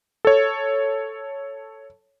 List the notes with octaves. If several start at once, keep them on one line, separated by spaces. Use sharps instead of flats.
A4 C#5